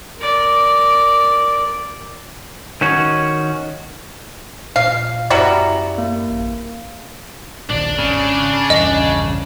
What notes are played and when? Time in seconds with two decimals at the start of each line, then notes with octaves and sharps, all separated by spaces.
0.18 A#4 D5
2.81 D#3 C#4 F#4
4.76 A#2 F5
5.30 F#2 G3 E4 F#4 D5 A#5
5.98 A#3
6.29 A1
7.70 A#1 D#2 D4 D5
7.98 G#1 C#3
8.70 A#1 E2 G2 D#5